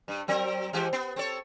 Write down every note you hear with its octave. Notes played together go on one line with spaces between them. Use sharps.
G2
F#3 C4 A#4
E3 G#3 G4
B3
C4 A4 C#5